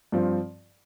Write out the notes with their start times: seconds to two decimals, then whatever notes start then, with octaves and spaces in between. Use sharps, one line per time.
0.12 G2 F3 C4